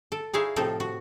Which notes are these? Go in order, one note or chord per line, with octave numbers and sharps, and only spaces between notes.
A4
D#4 E4 G#4 C#5 E5 F5
A2 C3 F3 C4 D#4 A4
F#4